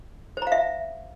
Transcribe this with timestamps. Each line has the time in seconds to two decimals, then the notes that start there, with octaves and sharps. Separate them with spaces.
0.37 C5
0.42 A#5
0.47 F5
0.52 E5